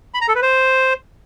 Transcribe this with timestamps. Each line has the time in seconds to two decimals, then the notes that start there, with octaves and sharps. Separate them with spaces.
0.14 B5
0.21 A#5
0.28 A4
0.35 B4
0.42 C5